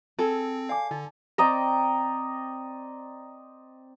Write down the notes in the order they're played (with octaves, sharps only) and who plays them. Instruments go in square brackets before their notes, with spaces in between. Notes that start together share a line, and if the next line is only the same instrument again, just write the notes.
[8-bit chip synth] C4 [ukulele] G#4 A4
[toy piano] D5 G#5 D6 [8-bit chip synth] F5
[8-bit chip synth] D3 [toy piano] D#4
[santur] C4 D5 D#5 A#5